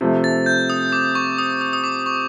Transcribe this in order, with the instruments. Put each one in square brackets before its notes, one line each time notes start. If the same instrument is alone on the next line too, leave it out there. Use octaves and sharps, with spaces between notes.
[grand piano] C3 F3 A3
[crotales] A6
G6
D#6
D6
C#6
D#6
D#6
D#6
D6
C#6